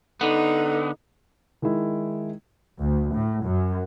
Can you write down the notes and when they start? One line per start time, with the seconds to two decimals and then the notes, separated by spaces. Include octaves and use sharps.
0.21 D3 B3 D#4 A4
1.62 D#3 G#3 D#4 E4
2.79 D2
3.14 A2
3.44 F#2